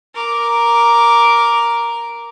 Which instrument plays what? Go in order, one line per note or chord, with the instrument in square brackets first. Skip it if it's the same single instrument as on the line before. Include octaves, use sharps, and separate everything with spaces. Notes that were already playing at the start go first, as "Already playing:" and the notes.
[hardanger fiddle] A#4 D6